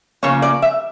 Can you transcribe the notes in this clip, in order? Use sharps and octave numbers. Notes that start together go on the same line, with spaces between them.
C#3 F3 A#3 C#5
D5
E5